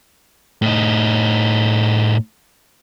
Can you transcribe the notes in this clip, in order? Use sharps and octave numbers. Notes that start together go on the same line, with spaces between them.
A2 D#4